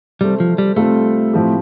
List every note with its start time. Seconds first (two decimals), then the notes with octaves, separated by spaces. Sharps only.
0.21 C3 G3 A3 C4
0.40 F3
0.58 G3
0.76 C3 G3 A3 C4 F4 A4
1.33 A2 F3 C4 G4